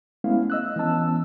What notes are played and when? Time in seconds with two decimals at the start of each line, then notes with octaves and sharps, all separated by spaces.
0.24 G#3 A3 B3 C#4 E4 F5
0.50 D#5 E6 F#6
0.76 E3 B3 C#4 A5 E6